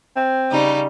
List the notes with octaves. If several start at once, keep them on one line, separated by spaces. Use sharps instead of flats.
C4
C#3 G3 D#4